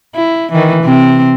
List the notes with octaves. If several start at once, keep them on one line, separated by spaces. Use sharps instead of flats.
E4
D#3 E3
C3 C4